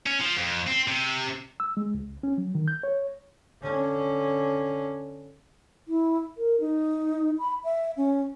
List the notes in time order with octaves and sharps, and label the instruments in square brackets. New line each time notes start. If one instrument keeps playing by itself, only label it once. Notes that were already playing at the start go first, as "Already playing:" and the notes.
[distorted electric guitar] C#4
F3
F2
C4
C3
[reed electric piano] E6
G#3
C#2
C#4
F#3
D#3
G6
C#5
[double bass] D3 C#4
[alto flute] E4
A#4
D#4
B5
E5
C#4